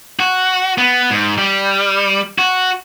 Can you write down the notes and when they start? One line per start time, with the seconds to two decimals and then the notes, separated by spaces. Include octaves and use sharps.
0.19 F#4
0.78 B3
1.11 G#2
1.38 G3
2.38 F#4